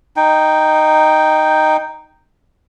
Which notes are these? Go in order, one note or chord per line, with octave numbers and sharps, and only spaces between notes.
D#4 G5